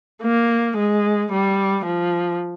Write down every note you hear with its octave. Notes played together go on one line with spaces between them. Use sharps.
A#3
G#3
G3
F3